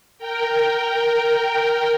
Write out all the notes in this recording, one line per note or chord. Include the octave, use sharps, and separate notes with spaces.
A#4 G5